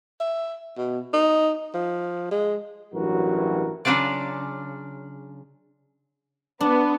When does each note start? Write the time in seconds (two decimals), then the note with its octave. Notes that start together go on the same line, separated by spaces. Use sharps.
0.21 E5
0.78 B2
1.13 D#4
1.74 F3
2.31 G#3
2.93 A1 G2 E3 F#3 F#4 A#4
3.85 C#3 F#3 D4 F4 D5
6.61 B3 D4